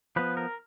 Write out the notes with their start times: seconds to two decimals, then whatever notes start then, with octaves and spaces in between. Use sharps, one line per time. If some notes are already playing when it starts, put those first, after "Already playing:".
0.16 F3 B3 B4
0.37 A#4